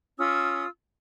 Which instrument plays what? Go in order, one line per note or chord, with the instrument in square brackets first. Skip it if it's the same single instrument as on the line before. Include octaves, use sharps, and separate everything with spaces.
[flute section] C#4 F4 D#6 E6